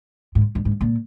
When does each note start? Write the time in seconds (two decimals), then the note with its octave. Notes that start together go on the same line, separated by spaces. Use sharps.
0.35 G#2
0.55 G2
0.65 G#2
0.81 A#2